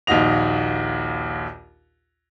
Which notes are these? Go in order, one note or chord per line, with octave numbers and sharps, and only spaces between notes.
A#1 D#2 D#4 F#4 D#5 F7